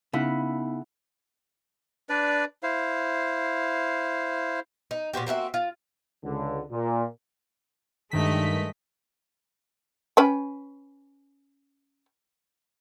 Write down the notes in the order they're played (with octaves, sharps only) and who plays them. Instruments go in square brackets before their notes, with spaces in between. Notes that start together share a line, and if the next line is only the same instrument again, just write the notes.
[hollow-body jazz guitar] C#3 [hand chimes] B3 D#4 [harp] E4 F#5 B5
[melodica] D4 B4 D5
E4 C5 F5
[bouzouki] D#4
A#2 C4 F#4 G4
A#3 C4 F#4 E5
F4
[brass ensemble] C#2 D3
A#2
[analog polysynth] G2 D#3 B6 [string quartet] G#3 A3 D#5
[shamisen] C#4 B4 G5